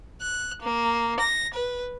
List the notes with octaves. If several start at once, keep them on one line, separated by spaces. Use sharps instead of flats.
F#6
A#3
A#6
B4